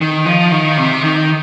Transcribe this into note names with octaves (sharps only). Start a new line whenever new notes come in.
D#3
F3
D#3
C3
D#3